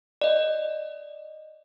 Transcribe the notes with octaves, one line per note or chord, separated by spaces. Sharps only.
D5 D#5